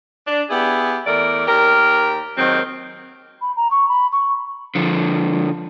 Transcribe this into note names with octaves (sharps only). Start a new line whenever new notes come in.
D4
B3 E4 G4 G#4
E2 A3 A#4 D5
D#2 G4 A#4
D#2 G#2 D#3 F#3 C4
B5
A#5
C#6
B5
C#6
D3 F3